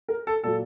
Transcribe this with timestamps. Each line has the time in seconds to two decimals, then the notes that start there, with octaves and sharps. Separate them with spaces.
0.08 A#4
0.27 A4
0.43 A#2 F#3 A4